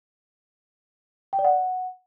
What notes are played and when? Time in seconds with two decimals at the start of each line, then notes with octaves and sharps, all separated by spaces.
1.33 G5
1.39 D5
1.44 F#5